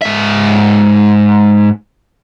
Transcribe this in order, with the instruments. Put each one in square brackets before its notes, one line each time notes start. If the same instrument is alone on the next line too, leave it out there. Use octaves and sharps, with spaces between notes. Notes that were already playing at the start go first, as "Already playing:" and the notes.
[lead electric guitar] G#2 E5